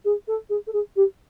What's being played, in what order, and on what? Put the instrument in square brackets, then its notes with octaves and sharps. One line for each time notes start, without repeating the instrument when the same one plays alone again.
[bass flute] G#4
A4
G#4
A4
G#4
G4